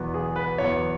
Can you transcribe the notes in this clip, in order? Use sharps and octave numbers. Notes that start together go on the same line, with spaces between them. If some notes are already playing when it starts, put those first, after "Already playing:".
Already playing: E2 B2 F#3 B3
G#4
B4
E2 B2 F#3 B3 C#5